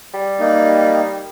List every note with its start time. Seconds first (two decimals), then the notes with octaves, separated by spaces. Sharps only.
0.14 G3
0.40 A#3 D#4